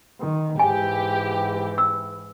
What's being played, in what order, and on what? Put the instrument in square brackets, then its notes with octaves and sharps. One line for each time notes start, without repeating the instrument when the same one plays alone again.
[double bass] D#3
[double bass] G#2 E3 [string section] G4 [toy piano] G#5
[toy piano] E6